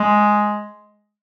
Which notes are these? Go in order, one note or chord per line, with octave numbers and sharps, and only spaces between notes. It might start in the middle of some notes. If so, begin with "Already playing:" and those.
Already playing: G#3